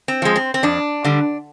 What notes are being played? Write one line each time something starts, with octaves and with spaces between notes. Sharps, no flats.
C4
F3 G#3
C4
C4
F2 D4
D3 G3